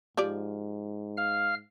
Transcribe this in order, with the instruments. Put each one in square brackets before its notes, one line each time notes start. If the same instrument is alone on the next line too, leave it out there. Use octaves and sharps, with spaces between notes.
[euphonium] G#2 [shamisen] F3 G4 D5
[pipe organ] F5 F6